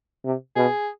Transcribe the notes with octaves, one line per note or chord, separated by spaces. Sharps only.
C3
B2 G#4